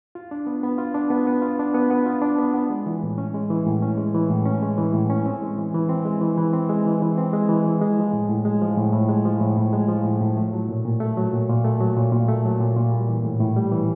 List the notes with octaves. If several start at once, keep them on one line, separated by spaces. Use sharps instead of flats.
F4
D4
B3
B3
F4
D4
B3
B3
F4
D4
B3
B3
F4
D4
B3
B3
G#3
E3
A2
C#4
G#3
E3
A2
C#4
G#3
E3
A2
C#4
G#3
E3
A2
C#4
C4
G#3
E3
E3
C4
G#3
E3
E3
C4
G#3
E3
E3
C4
G#3
E3
E3
G#3
F3
A2
A2
G#3
F3
A2
A2
G#3
F3
A2
A2
G#3
F3
A2
A2
A3
F#3
A#2
A#2
A3
F#3
A#2
A#2
A3
F#3
A#2
A#2
A3
F#3
A#2
A#2
G3
E3
A2
A2
G3
E3